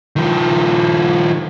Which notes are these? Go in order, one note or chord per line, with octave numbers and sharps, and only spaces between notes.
D#3 F3